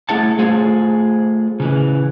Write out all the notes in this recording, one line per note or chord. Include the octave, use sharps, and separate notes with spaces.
A3 E4 G#4 F#5 A5
A3 F4 G#4 C5
C#3 E3